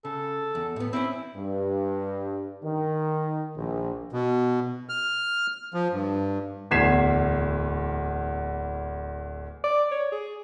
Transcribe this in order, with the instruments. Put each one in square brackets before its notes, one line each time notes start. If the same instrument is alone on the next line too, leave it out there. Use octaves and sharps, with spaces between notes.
[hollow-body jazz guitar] C#3 [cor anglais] A4
[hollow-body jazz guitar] E2
A2 B3
[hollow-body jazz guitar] C4 C#4 [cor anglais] E4
[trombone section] G2
D#3
A#1
[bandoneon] B2
F6
F3
G2
[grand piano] D1 E2 G#6 B6 C7 E7
[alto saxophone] D5
C#5
G#4